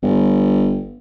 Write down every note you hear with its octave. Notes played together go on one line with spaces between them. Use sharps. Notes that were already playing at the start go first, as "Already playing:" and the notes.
G1